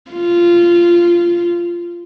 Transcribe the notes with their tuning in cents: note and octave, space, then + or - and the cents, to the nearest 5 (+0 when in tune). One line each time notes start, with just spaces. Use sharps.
F4 -15